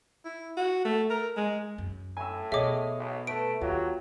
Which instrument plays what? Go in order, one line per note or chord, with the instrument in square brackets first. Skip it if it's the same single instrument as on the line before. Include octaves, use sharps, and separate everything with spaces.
[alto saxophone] E4
F#4
A3
A#4
G#3
[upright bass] F#2
[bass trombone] A2 [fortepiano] G#5 E6
[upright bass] B2 [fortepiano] G#4 C#5 D#5 [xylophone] E5 D6
[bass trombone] B1
[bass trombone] A3 [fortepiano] B4 [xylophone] D7
[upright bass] D#2 [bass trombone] F#3 [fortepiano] F4 G4